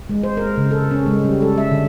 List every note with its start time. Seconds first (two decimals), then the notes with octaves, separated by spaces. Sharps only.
0.09 G#3
0.23 C5
0.37 A#4
0.57 C#3
0.71 A4
0.91 C#4
1.06 G#3
1.25 G3
1.42 A4
1.58 E5
1.72 D3